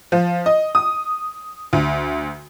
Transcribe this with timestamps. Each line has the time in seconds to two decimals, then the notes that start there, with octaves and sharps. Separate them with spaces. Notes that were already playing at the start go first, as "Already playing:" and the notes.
0.12 F3
0.46 D#5
0.75 D#6
1.73 D2